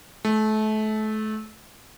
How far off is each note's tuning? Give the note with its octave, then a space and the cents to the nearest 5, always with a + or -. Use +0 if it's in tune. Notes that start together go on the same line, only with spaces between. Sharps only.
A3 -30